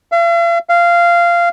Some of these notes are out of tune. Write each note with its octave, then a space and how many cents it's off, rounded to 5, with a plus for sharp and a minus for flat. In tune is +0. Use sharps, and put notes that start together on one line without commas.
F5 -45
F5 -15